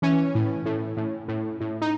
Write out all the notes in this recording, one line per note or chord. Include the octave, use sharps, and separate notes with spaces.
E3 C#4
A2
A2
A2
A2
A2
D#4